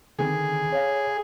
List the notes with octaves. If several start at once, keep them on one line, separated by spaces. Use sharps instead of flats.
D3 D#3 C4 G#4
C#5 F5